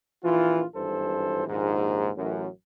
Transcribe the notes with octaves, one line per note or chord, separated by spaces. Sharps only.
A#1 E3 F4
G#1 G2 E3 A4 C5
A#1 D#2 G#2
A1 F#2